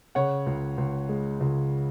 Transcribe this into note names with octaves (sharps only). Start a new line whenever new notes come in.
C#3 C#5 F#5
C#2
C#2
G#3
C#2